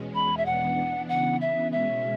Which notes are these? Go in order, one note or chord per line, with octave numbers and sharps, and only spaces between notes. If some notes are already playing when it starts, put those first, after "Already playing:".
Already playing: E2 B2 G#3 C#4
B5
E5
E3 B3 D4 F#5
C#3 E3 B3 F#5
E5
B2 G#3 C#4 E5